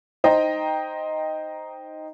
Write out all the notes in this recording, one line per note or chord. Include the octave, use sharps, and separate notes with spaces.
D#4 C5 D#5 G5 A#5